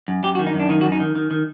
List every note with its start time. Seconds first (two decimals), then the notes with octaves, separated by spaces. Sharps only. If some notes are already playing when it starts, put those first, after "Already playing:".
0.08 F#2
0.24 F#2 G4
0.35 F#4
0.39 D#3
0.47 D#4
0.54 F#2
0.60 D4
0.69 D#3 D#4
0.81 F#4
0.85 F#2
0.92 D#4
1.00 D#3
1.15 D#3
1.31 D#3